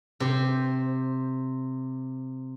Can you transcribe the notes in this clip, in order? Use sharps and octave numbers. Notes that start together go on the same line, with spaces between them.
C3 C5